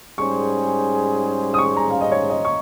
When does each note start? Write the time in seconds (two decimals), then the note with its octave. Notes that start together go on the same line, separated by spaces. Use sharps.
0.18 G#2 G3 C#4 G#4 C5 C#6
1.54 D#6
1.58 C#6
1.77 A#5
1.90 F5
2.01 D#5
2.12 C#5
2.30 D#5
2.45 C#6